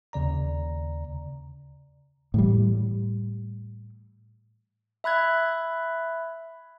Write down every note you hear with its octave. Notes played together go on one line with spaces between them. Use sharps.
D#2 C#3 D5 A#5
A2 E3 G3
E5 B5 F#6 G#6